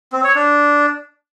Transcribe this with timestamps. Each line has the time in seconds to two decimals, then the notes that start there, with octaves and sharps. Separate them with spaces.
0.12 C4
0.24 C#5
0.35 D4